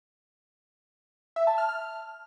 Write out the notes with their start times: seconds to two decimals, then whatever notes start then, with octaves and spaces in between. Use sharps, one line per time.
1.36 E5
1.47 A5
1.58 F6
1.69 F6